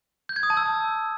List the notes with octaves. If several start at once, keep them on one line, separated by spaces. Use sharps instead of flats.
G6
G#6
D#6
A5
E6